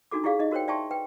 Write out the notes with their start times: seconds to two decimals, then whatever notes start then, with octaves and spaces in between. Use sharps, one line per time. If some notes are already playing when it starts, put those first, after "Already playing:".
0.11 D4 D#4 F#4 A4 D6
0.24 E4 G4 G#4 D5 F5
0.39 D#4 D#5
0.51 F#4 A#4 C5 C#5 G5
0.68 D5 E5 G5 A5 C6 C#6
0.91 B4 G5